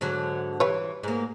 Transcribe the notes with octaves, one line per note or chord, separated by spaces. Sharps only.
G#2 D3 F#3
E3 G3 B4 C#5
G#2 A#3